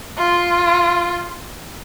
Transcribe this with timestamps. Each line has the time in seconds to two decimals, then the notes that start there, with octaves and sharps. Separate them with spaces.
0.18 F4